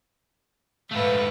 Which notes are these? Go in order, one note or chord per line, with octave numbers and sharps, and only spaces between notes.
G#2 A3 B4 F5